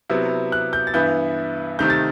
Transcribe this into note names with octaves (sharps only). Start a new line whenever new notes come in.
C3 F#3 B3 E4
F#6
G6
A6
G2 E3 B3 E4 G6
C3 D#3 A3 G6
A6